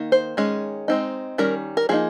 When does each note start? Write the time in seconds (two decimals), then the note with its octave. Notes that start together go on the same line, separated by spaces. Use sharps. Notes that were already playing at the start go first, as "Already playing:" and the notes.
Already playing: D#3 A#3 D#4
0.12 C5
0.37 D#3 G#3 C#4
0.88 G#3 C4 D#4
1.38 D#3 G3 C#4 A#4
1.77 A#4
1.89 F3 A#3 D#4 G#4